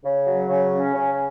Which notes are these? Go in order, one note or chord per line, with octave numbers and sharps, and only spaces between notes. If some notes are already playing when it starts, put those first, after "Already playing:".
C#3
F#3
C#3
C#4
C#3